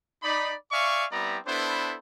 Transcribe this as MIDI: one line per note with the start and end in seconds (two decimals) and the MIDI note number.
0.23 0.54 63
0.23 0.54 74
0.23 0.54 83
0.71 1.05 74
0.71 1.05 76
0.71 1.05 77
0.71 1.05 80
0.71 1.05 85
1.12 1.39 55
1.12 1.39 59
1.12 1.39 60
1.12 1.39 64
1.12 1.39 74
1.12 1.39 82
1.46 1.96 59
1.46 1.96 62
1.46 1.96 64
1.46 1.96 69
1.46 1.96 71
1.46 1.96 72